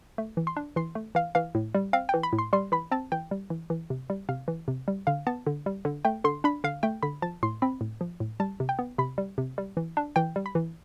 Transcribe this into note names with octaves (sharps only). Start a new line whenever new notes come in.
A3
E3
C6
D4
E3 C6
A3
E3 F5
E3 F5
A2
G3
C4 F5
E3 G5
B5
A2
C6
G3 C6
E3 B5
C4 A5
E3 G5
G3
E3
E3
C3
G3
C3 F5
E3
C3
G3
D3 F5
B3 A5
D3
G3
D3
A3 G5
D3 C6
D4 B5
D3 F5
A3 G5
D3 B5
F3 A5
A2 C6
C4 B5
A2
F3
A2
G3 A5
C3
G5
B3
C3 B5
G3
C3
G3
E3
D4
E3 G5
G3
B5
E3